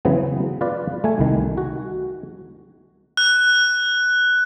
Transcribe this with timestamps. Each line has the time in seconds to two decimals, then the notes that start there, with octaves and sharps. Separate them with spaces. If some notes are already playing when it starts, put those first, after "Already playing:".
0.05 C#3 E3 F#3 B3 C4
0.61 F4 B4 D5
1.04 A3 G#5
1.19 C2 D#3
1.58 F#4
3.17 F#6